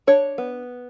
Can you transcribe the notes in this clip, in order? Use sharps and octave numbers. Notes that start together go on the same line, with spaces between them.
D4 C#5
B3